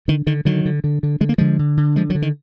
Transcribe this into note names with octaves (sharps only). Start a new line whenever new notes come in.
D3 D#3
D3 D#3
D3 D#3 F#3
D3
D3
D3
D3 G#3
A#3
D3 F3 G#3
D3
D3
D3 F3 G#3
D#3 F#3
D3
D#3